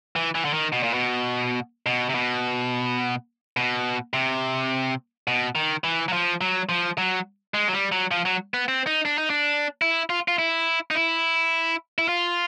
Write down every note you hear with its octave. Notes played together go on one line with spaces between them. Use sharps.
E3
E3
D3
D#3
B2
A#2
B2
B2
C3
B2
B2
C3
B2
D#3
E3
F#3
F3
F#3
F3
F#3
G#3
F#3
G3
F#3
F3
F#3
B3
C4
D#4
D4
D#4
D4
E4
F4
F4
E4
D#4
E4
E4
F4